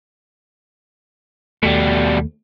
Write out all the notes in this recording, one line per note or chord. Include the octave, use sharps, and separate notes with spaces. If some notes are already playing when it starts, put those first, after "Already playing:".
D#2 B2 G3 A3